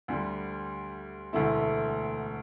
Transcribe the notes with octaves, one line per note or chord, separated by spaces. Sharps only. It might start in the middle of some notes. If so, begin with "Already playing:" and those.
D2 D3 G3
E1 D2 D3 A3 E4